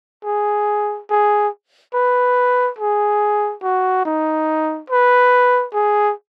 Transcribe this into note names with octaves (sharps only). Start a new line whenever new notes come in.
G#4
G#4
B4
G#4
F#4
D#4
B4
G#4